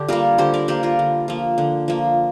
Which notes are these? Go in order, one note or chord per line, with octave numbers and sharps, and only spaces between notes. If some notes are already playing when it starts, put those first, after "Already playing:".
Already playing: D3 D4 G4
G3 A#3 F4 A#4
D3 G4 C5
A#4 D5
G3 A#3 G4 C5
F4 A#4
D3
F3 A#3
D3
F3 A#3